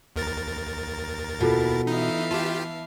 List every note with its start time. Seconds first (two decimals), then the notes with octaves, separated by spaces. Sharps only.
0.16 D#2 A#4 A6
1.40 B2 E4 F4 A4
1.87 E3 D#4 E5 F5
2.31 F4 G4 A5